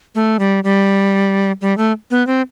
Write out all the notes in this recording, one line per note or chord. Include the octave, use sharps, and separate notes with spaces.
A3
G3
G3
G3
A3
B3
C4